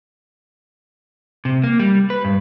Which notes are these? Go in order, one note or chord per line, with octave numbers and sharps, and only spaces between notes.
C3
A#3
G3
B4
G2